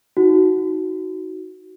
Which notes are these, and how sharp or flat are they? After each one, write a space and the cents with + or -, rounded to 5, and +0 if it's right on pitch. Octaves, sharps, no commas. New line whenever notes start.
D#4 +25 F#4 +5